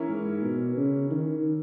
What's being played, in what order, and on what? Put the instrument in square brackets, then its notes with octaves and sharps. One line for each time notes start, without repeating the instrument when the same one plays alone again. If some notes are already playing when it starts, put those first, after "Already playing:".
Already playing: [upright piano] E3 A#3 C#4 E4 A#4
[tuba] G#2
B2
C#3
D#3